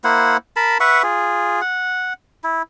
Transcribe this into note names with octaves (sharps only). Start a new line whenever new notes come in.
A#3 E4 C5 F#5
A#4 A5 B5
B4 E5 F#5 C#6
F4 G#4
F#5
E4